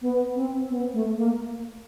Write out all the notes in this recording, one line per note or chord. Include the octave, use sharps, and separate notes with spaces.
B3
C4
B3
A3
A#3